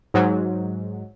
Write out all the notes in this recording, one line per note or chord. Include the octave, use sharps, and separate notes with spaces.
G#2 F#3